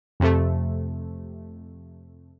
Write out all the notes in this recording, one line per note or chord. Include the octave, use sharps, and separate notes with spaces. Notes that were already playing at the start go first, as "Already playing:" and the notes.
F2 C3 A3